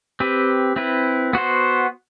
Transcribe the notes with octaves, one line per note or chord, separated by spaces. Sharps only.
C4 G4 B4
C4 E4 B4
B3 F#4 C5